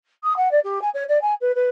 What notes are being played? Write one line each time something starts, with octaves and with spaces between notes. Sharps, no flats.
D#6
F#5
D5
G4
G#5
C#5
D5
G#5
B4
B4